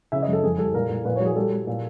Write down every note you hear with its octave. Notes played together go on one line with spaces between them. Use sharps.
C#3 E5
D#5
F#2
A4
F2 G#4
G3 A4
A#2 A#4
A#2
A#2 B4
C#5
F#3
G#4
G3 A4
G3
A#2